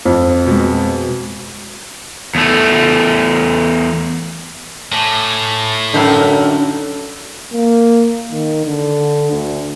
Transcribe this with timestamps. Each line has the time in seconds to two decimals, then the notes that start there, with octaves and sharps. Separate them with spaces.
0.05 F2
0.46 B2 G#3
2.35 E2 A3
4.92 A2 G#5 A5 D6
5.94 F#2 D3 D#4 A5 B5 E6
7.53 A#3
8.31 D#3
8.65 D3
9.31 D2